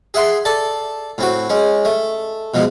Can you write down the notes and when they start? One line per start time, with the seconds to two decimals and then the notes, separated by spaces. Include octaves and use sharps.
0.14 G#4 E5 F#5 C6
0.45 A4 D5 A5
1.18 A2 C4 F#4
1.50 G#3 C#4
1.85 A3
2.54 B2 F3 G#3